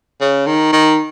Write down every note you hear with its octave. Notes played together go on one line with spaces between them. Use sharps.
C#3
D#3
D#3